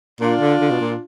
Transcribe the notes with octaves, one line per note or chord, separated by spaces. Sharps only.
A#2 D4 F4
D3
D3
B2
A#2